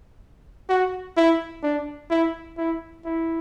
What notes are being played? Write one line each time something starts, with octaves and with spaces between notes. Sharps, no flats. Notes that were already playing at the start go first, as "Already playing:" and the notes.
F#4
E4
D4
E4
E4
E4